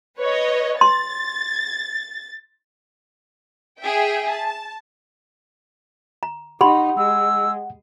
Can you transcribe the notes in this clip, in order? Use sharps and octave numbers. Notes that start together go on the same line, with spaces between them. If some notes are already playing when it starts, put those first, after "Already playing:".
B4 C#5 D#5
C6 A6
G#4 E5 G5
A5
A#5
D#4 G4 F#5 B5 C6
G#3 E6